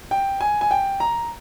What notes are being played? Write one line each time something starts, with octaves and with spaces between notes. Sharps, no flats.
G5
G#5
G#5
G5
A#5